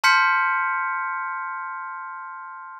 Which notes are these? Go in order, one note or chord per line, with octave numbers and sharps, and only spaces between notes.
A5 C6 F6 G6 B6 C#7